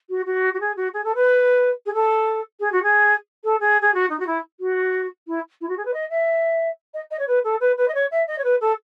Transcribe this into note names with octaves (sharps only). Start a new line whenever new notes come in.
F#4
F#4
F#4
G#4
F#4
G#4
A4
B4
G#4
A4
G#4
F#4
G#4
A4
G#4
G#4
F#4
D#4
F#4
E4
F#4
E4
E4
F#4
G#4
B4
D#5
E5
D#5
D#5
C#5
B4
A4
B4
B4
D#5
C#5
E5
D#5
C#5
B4
A4